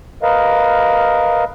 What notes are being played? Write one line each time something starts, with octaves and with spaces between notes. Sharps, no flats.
A#4 B4 D#5 F5